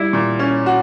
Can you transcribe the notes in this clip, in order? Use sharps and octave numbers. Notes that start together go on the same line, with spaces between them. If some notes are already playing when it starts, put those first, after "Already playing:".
Already playing: G3 E4
A#2
C#4
F#4